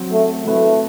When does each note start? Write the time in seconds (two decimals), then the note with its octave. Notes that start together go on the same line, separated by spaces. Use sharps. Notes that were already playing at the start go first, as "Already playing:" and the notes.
Already playing: F#3 C4 F#4
0.11 A3
0.45 F#3 A3 C4 E4 B4